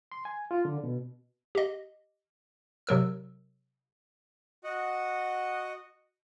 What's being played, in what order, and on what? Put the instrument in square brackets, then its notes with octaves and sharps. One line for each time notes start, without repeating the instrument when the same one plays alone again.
[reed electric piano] C6
G#5
F4
D3
B2
[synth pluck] G4 D#5
C3 F#3 A#4 E6
[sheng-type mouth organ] F#4 D#5 F#5